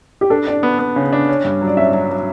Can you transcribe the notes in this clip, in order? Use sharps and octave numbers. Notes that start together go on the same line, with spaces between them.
G4
D4 A4
D4 D5
B3
B3
C#3
D4
C#4
G2
F#3
D5
C#4 E5
F#3
F#3